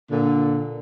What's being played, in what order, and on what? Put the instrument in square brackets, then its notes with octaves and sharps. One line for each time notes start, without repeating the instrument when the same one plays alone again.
[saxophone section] A#2 D3